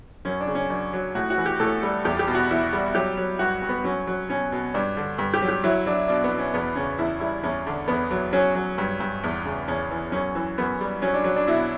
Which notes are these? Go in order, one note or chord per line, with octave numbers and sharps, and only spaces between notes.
F#2 C#4
D4
C#3
C#4
F#2 D4
F#3
A2 F#4
F#4
E3
G4
A2 A4
G3
E2 G4
G4
B2
F#4
E2 E4
G3
F#3 G4
F#3
G2 F#4
G2
B3
F#3 C#4
F#3
B2 C#4
B2
G2 D4
D3
G2
G4
F#3
G4
F#3 E4
F#3 D4
B2 D4
B3
B2
C#4
E2 B3
C#3 C#4
E2 E4
G3 E4
E2 C#4
D3
E2 B3
F#3
F#3 C#4
F#3
G2
G2
E2
C#3
E2 C#4
E3
F#2 C#4
E3 C#4
F#2 B3
G3
F#3 C#4
D4
F#3
D4
B2 E4